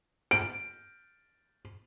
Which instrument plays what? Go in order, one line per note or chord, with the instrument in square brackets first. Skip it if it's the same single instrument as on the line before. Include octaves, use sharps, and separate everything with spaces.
[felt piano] D7